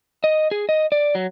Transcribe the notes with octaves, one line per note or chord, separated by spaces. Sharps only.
D#5
G#4
D#5
D5
F#3